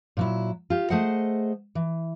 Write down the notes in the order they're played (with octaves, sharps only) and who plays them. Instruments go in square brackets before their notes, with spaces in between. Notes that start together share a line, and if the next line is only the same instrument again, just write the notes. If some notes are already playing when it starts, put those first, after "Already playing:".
[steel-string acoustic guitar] A#2 F#3 E4
F4 G4
A3 G#4 C5 D#5 F#5
E3